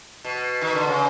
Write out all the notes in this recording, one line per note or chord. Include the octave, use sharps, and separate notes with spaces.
B2
D#3
D3
C#3